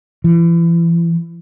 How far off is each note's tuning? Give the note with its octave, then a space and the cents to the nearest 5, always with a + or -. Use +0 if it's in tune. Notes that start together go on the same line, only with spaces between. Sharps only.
E3 +35